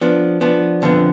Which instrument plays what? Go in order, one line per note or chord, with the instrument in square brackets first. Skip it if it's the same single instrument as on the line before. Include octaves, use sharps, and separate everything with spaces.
[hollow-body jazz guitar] F3 B3 D4
F3 B3 D4
F2 D3 F3 B3